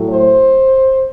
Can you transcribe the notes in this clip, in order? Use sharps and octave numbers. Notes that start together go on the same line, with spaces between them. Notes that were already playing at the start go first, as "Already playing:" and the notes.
Already playing: A2 F#3 A3
C5